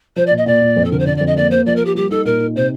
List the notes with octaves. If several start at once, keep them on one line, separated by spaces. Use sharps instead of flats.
F3 C5
D5
A#2
D#5
A#2 D5
A#2
F2
A4
D3 A#4
C5
D3 D5
D5
F2
D#5
A#3 D5
A#3 C5
F3 D5
A#4
A#3 G4
G3 G4
D#4 A4
A#2 A#4
D#4
C3 C5